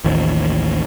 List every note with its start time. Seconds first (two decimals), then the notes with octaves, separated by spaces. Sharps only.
0.05 A1 D#2 D#3 F3